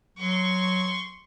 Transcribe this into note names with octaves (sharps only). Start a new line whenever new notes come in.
F#3 C6 C#6